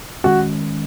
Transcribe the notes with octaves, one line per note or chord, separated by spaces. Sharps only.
D#3 G#3 C#4 F#4